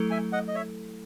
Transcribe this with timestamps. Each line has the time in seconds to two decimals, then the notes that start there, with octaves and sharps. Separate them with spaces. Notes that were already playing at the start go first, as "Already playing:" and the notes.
Already playing: F#3 A3 E4 A4
0.10 E5 G#5
0.32 D#5 F#5
0.48 D#5
0.54 C#5 E5